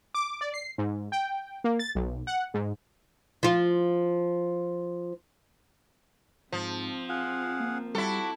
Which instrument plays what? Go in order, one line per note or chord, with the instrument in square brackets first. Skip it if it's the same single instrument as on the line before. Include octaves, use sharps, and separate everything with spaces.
[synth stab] D6
D5
C7
G#2
G5
A#3
A6
B1
F#5
G#2
[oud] F3 F4
[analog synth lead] G#2 [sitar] F3 [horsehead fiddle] C4
[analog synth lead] F4 [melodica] G#4 F5 F#5
[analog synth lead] A#3
[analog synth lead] G3 [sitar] E4 A4 [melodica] F#4 D6